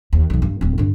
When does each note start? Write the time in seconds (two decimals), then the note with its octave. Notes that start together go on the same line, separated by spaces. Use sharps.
0.13 D#2
0.30 B1 E2
0.42 G2
0.61 D1 C4
0.78 G2 D3